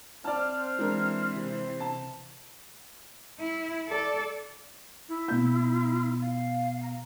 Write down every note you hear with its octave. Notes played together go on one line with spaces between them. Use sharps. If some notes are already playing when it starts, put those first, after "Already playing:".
C4 C5 D5 A5 F6
E3 G#3 D4 A#4
C3
A5
E4
A4 D5
E4
B2 G6
F5
A#5